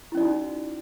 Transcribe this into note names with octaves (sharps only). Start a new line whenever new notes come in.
C#4 D#4 E4 F#4 D5